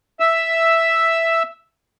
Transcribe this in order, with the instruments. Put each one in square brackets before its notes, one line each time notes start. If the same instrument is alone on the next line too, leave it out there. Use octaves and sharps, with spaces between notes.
[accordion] E5 E6